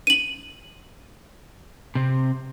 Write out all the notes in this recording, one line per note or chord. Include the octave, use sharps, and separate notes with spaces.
D#7 F#7
C3 C4